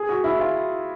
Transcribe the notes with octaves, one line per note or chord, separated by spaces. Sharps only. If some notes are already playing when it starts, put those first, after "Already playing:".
Already playing: G#4
F#4
E4
F4